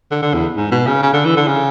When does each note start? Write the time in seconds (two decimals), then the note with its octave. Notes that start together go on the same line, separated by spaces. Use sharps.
0.11 D3
0.22 D3
0.34 E2
0.57 G#2
0.71 B2
0.87 C#3
1.02 C#3
1.13 D3
1.25 E3
1.37 D3
1.48 C#3